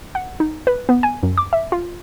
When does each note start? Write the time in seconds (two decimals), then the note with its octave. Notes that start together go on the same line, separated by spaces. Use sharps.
0.15 F#5
0.40 D#4
0.67 B4
0.89 B3
1.03 G#5
1.23 F#2
1.37 D6
1.53 E5
1.72 F4